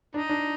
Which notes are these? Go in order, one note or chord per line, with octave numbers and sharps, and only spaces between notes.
D4 D#4
D4